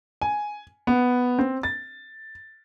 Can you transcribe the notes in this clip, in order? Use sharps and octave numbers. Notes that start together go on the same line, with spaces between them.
G#5
B3
C4
A6